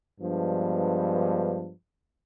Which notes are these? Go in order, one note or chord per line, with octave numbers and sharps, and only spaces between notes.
G2 F3 G#3 B3 D4